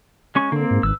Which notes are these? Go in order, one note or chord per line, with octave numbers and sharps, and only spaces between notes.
G#3 C#4 C#6
D3 A#3 C4
G#2
G#1 B4 E6